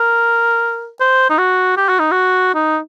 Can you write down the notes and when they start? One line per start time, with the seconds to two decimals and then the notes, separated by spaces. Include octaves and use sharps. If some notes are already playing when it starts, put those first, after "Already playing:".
Already playing: A#4
1.01 C5
1.30 D#4
1.38 F#4
1.77 G4
1.89 F#4
1.99 D#4
2.12 F#4
2.55 D#4